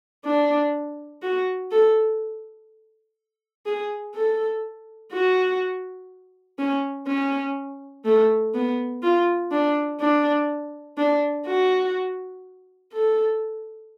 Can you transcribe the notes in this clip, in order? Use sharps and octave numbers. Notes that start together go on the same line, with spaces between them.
D4
F#4
A4
G#4
A4
F#4
C#4
C#4
A3
B3
F4
D4
D4
D4
F#4
A4